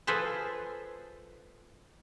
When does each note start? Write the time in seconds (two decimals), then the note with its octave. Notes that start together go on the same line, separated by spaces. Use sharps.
0.07 F3 G#4 A4 B4 C5